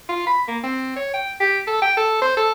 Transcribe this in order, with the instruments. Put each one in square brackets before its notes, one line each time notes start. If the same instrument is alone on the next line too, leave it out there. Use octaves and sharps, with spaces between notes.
[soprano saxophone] F4
B5
A#3
C4
C#5
G5
G4
A4
G5
A4
C5
A4